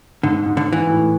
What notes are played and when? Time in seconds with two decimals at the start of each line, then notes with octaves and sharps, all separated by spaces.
0.23 G#2 D3
0.46 G#2
0.57 D3
0.68 G#2 E3
0.90 A2